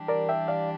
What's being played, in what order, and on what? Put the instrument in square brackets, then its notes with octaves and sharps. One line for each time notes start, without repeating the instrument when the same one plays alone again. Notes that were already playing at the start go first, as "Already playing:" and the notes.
Already playing: [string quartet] E3 G3 D4 G4
[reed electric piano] A#4 D5
E5 G5
D5 F5